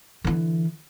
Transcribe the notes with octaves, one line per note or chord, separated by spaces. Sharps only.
D3 E3